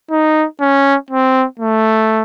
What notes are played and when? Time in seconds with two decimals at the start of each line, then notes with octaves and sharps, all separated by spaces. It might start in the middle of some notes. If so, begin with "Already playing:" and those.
0.11 D#4
0.61 C#4
1.11 C4
1.60 A3